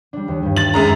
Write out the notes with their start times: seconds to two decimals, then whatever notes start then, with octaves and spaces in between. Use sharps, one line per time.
0.13 G3 D4
0.28 D#2
0.42 G2 G3
0.57 A6 F#7
0.74 F#2 G#3 A#5